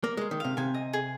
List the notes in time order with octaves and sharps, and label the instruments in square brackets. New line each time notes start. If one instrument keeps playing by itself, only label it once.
[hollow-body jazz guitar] A#3 [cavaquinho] A#4
[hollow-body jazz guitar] G#3 [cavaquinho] C6
[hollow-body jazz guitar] D#3
[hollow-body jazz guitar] C3 [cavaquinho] F5
[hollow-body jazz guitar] C3 [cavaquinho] G#5
[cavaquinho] D#5
G#4